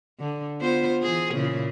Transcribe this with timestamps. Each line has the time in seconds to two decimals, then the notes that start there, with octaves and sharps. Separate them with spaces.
0.20 D3
0.61 B3 F4 C5
1.02 E3 G#4
1.33 A#2 C#3 E4